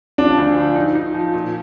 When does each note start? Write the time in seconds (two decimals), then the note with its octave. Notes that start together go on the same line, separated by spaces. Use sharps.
0.18 F3 D4
0.38 D2
0.57 F3
0.76 D#4
0.95 D#4
1.14 F3
1.34 A#2